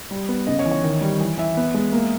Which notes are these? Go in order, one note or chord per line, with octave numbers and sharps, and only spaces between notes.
G3
B3
C#3 D#5
C#5
E3
C#5
D#3
G3
E3
E3 E5
B3
G#3
A#3